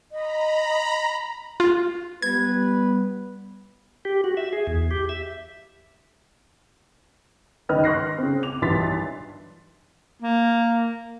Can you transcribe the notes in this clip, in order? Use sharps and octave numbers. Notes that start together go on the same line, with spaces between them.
D#5 A#5 B5
F4
G3 B3 B4 G#6
G4
F#4
E5
G#4
E2
G4
E5
C#2 D#3 B4 D#5 F6
C6 C#6 F#6 A#6 C7
C#3 C4
D6 F7
B1 G2 E3 C6 A6 B6
A#3